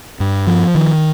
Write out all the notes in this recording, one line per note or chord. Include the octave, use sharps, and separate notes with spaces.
G2
F3
D#3